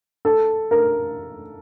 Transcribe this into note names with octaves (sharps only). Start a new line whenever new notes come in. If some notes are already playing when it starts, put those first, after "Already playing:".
A4
A#4